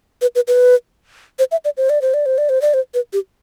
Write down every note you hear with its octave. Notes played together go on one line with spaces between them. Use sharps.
B4
B4
B4
C5
E5
D5
C5
D5
C5
D5
C5
D5
C5
D5
C5
B4
G4